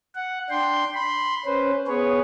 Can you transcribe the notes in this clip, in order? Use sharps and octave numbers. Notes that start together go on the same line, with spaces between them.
F#5
D4 G5 C6
B5 C6
C#4 B4 C5
B3 G#4 B4 C#5